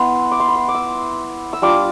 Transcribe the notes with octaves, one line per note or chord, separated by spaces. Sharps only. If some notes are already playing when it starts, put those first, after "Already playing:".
Already playing: B3 E4 C6
D6
C6
B5
C6
D6
E6
E6
G3 D4 F4 D6